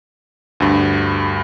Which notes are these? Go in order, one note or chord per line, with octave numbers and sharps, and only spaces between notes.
D2 G2